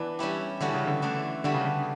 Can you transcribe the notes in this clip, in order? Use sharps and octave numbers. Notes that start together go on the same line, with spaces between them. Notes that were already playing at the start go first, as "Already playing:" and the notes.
Already playing: E3 B3 D4 B4
G3 C#4 E4 G4
D3 E3 G3 C#4 F#4 A4
C#3
D3
E3 A3 D4
D3 G3 B3 D4 F#4
C#3
D3